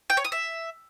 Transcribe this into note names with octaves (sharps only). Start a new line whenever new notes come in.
G5
C#5
D#6
E5